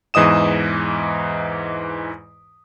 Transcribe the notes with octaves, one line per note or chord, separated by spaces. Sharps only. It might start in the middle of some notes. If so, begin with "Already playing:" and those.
E2 G#2 E3 D#5 D#6 E7